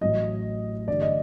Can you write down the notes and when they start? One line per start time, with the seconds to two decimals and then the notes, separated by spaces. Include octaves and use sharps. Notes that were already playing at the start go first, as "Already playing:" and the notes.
0.01 A1 A2 F#3 D#5
0.88 A1 G2 D3 G3 D5
1.01 D#5